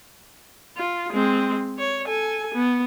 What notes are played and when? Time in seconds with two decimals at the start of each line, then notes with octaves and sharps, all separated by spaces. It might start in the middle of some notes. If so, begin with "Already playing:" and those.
0.77 F4
1.11 G#3 C4
1.79 C#5
2.07 A4 G#5
2.54 B3